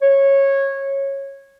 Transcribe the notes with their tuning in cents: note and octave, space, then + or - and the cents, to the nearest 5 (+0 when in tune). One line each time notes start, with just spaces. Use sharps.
C#5 -15